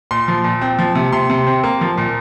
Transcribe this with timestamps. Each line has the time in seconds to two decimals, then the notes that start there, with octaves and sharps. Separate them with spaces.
0.11 A#2 C6
0.28 F3
0.44 A#2
0.61 C4
0.79 F3
0.95 C3
1.12 C3 C6
1.30 C3
1.47 C4
1.64 A#3
1.81 F3
1.98 A#2